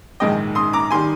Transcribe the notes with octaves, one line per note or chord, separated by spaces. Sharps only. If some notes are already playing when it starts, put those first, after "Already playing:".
A#1 G#2 D#3 G#3 D#5 G5
C6 D#6
A#5 D6
D#3 G3 G#5 C6